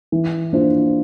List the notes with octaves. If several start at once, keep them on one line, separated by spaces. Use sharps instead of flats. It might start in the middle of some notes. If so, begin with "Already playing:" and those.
E3
A#3 D4 F4 C5